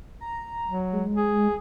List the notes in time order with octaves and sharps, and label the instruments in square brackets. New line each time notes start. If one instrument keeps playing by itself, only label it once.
[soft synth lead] A#5
[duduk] F#3
[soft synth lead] G#3
[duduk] G#4